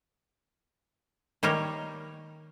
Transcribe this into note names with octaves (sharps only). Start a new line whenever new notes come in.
D#3 G3 A#3 G4 C#5